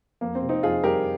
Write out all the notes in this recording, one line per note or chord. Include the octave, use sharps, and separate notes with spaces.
F2 A#3
C4
C3
C4 D#4
F2 F4 G#4
G3 G4 A#4